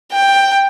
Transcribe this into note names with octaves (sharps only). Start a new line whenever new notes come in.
G5